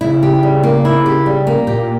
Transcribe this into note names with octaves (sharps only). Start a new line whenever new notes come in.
C#3 E4
G4
G3
A#3
E4
G4
G3
A#3
A#2 G4